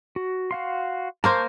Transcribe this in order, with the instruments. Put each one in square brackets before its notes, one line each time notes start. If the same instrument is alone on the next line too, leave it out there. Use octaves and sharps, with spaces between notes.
[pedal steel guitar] F#4
F#4 F5 C6
[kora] A#3 A#4 C5 [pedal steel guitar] A5 C#6 G6